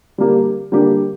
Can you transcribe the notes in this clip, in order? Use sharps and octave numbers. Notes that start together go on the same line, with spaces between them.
D3 G3 A#3 D4 G4
D3 G3 A#3 D4 G4